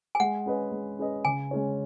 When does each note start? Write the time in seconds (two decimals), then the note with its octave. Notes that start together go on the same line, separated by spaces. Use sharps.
0.15 G#5
0.20 G#3 F#5
0.46 C#4 G#4 B4 D#5
0.72 G#3
0.99 C#4 G#4 B4 D#5
1.25 C#3 G#5
1.51 G#3 C#4 G#4 C#5